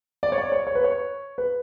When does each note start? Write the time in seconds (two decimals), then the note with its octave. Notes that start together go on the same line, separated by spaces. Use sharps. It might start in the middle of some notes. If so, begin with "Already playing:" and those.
0.23 D5
0.32 C#5
0.38 D5
0.52 C#5
0.67 C#5
0.75 B4
0.84 C#5
1.38 B4